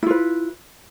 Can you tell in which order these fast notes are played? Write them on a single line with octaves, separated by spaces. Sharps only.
E4 F4 B4